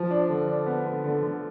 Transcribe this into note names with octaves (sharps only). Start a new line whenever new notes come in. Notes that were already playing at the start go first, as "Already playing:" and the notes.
Already playing: F3
D4
D3
D4
B3
D3
D3
D3